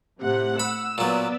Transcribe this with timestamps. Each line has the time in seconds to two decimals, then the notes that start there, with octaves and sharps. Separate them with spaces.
0.21 A2 C3 F#5
0.60 B5 E6
0.98 A#2 F#3 B3 D5